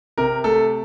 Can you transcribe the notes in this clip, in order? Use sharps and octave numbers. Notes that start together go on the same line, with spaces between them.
C3 A#4
A3 A4